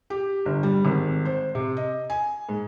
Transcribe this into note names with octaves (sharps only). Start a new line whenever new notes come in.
G4
G1
G3
G#1
C5
C3
D#5
G#5
G#2